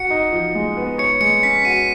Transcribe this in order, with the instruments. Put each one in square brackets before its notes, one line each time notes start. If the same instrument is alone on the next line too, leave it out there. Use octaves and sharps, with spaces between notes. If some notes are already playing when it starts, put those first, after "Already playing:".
Already playing: [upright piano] F#4 [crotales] C#7
[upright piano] D#4
F3
G#3
B3
[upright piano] C#5 [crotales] C#7
[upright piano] G#3 [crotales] C#7
[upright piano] C#4 [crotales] B6
[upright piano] F#4 [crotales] D#7